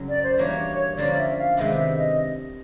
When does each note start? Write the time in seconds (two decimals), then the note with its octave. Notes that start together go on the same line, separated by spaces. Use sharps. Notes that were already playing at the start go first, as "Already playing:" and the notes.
Already playing: F#2 C#3 F#3
0.09 D5
0.23 C5
0.38 E3 G3 A#3 D4 F#4 C#5
0.97 D3 F3 A#3 C#4 F4 D5
1.17 E5
1.37 F5
1.57 C3 D#3 G#3 B3 D4 E5
1.76 E5
1.97 D#5